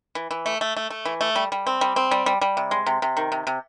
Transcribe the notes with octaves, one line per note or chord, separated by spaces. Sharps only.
E3
E3
A3
A3
A3
A3
E3
A3
G3
G3
C4
G3
C4
G3
G3
G3
C3
G#3
C3
C3
D#3
C3
C3